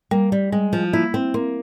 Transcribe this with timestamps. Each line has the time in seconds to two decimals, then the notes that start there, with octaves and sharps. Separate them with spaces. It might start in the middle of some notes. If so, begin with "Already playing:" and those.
0.11 G3 A#3
0.32 G3
0.52 G3 G#3
0.73 F3
0.93 A#3 E4
1.14 C4
1.34 A#3 C4